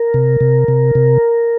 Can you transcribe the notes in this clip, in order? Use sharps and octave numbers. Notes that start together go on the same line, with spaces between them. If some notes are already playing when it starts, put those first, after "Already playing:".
Already playing: A#4
C3
C3
C3
C3